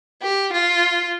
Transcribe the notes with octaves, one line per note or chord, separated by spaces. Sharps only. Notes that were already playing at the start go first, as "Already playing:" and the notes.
G4
F4